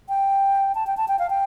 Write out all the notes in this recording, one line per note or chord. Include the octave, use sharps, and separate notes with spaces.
G5
A5
G5
A5
G5
F5
G5